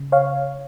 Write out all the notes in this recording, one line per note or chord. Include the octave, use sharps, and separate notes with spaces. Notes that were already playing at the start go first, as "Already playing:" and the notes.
Already playing: C#3
C#5 F5